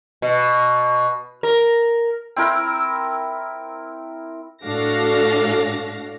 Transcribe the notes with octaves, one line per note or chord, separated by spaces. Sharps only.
B2
A#4
C4 E4 A#4
A2 D4 F#4 A4 F5 A#6